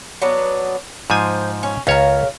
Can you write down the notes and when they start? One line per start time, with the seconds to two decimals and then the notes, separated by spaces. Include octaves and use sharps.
0.22 F#3 B3 D4
1.10 G#2 F3 C5 G#5
1.63 C#4
1.87 C#2 C#3 A#4 C#5